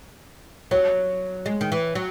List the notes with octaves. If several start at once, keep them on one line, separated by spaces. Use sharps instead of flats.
F#3 C#5
G#3
D#3
E3
F#3